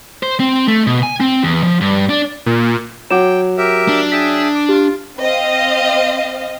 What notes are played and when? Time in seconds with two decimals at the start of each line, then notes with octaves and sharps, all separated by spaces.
0.23 C5
0.40 C4
0.68 A3
0.87 B2
1.03 G#5
1.20 C4
1.44 E2
1.63 F3
1.81 G2
2.09 D4
2.46 A#2
3.10 F#3 F#5 G5 D6 E7
3.57 G4 A#4 E5
3.88 D4
4.12 G#4 E5 G5 B6
4.55 D6
4.69 F4 G4
5.20 C4 D#5 F5